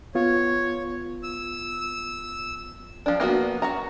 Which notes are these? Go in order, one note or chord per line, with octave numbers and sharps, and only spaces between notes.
B3 F4 C#5
E6
F3 D4
A#3 B3 E4 F#4
F#4 F#5 A#5